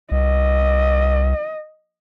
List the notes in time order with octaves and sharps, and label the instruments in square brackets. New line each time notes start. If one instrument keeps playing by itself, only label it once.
[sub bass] C2 [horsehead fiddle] D#5